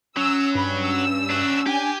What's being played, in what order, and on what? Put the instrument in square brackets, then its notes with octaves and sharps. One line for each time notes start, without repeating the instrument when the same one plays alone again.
[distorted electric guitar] F#3 [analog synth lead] C#4 [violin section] E6
[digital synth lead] G2 [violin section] B5
[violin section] E6
[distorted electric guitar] D4 F#4
[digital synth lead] D4 [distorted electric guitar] G4 [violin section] G#5